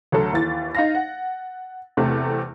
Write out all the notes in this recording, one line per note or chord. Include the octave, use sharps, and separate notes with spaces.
D2 F#3 A4
D#2 E3 A6
D#4 F5 A#6
F#5
E2 C3 A3